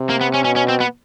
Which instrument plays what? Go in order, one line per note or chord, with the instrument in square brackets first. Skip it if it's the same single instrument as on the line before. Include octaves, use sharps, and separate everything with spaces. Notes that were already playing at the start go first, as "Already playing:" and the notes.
Already playing: [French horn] C3
[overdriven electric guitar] A#3
B3
C#4
[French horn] B2 [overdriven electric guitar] C#4
[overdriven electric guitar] C#4
C4
B3